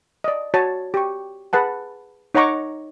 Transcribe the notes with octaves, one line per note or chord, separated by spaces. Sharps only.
D5 D#5
F#4 C#5 A5
G4 C#6
G#4 B4 F#5 A5
D#4 C#5 F#5 A#5 C#6 D6